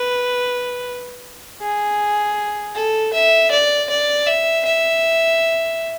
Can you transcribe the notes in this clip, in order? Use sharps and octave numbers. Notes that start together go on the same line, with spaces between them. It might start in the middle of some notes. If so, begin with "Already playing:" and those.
Already playing: B4
G#4
A4
E5
D5
D5
E5
E5